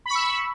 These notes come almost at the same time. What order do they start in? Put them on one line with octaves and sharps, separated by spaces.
B5 C#6 E6